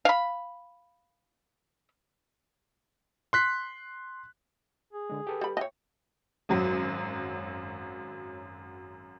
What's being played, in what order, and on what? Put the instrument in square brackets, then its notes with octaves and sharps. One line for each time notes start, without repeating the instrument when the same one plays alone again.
[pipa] F5 B5
[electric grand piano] C6 F#6 B6
[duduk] G#4
[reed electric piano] D3 G#3
G4 A4 B4
[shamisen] G3 B5
[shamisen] C#5 D#5 [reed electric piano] E5 G5
[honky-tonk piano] G#1 F#2 F#3